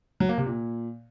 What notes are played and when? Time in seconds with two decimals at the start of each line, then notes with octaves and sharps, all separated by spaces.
0.20 F#3
0.29 A#3
0.38 C3
0.46 A#2